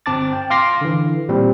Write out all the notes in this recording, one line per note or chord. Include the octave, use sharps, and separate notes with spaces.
G1 C4 A5 D6 A6
G5
F5 C6 D6 A#6 C7
D3 E3
A#2 G3 C4